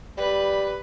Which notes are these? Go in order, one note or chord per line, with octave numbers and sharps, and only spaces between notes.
G3 B4